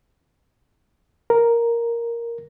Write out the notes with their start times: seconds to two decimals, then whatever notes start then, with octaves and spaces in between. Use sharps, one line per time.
1.30 A#4